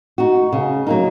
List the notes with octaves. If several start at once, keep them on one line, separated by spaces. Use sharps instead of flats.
D#4 F#4
C#3
F#3 A#3 D#4